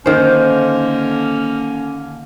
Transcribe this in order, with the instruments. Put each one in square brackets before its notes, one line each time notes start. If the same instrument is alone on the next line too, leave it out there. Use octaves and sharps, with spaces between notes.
[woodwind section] D3 A#3 C#4 [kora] D#3 C5